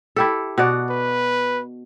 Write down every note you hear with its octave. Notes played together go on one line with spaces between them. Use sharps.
E4 G4 A4
B2 F#4 D5
B4